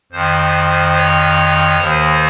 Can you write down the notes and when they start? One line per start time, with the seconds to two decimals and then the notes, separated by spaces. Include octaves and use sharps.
0.12 F2 D#3 C5
0.96 C#5
1.79 D#2 D#3 C5